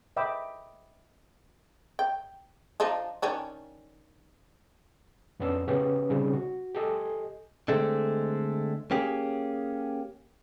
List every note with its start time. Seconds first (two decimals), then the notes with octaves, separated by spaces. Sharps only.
0.17 D#5 E5 G5 B5 D6 E6
1.99 G5
2.80 F3 D4 D#4
3.22 D#3 C#4 D4
5.40 F2 B3 C#4 D4 E6
5.67 C#3 B3 C#4 G4 B4
6.10 C#3 G3 C4 D#4
6.33 F#4
6.75 G4 A4 D#5 G#5
7.68 D3 G#3 A3 C4
8.91 A#3 C#4 G4 G#4